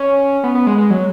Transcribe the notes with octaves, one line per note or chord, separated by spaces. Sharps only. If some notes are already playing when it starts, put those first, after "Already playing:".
Already playing: C#4
B3
B3
G#3
G#3
F#3